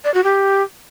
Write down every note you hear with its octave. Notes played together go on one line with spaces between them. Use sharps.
D5
F#4
G4